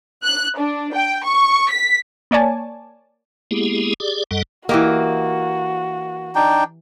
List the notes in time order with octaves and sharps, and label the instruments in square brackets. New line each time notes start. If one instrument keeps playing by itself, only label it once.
[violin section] F#6
D4
G5
C#6
B6
[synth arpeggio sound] A#3 C#5 D5 G#5 A5
[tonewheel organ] G#3 A#3 B3 E4 G4 G#4
G4 G#4 D5
F#2 G3 A4 D#5 F#5
[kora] E3 G4 D#5 [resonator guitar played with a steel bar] A#3 [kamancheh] F#4
[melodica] D4 D#4 G5